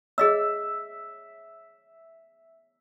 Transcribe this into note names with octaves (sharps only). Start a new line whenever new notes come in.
G#4 D#5 E5 E6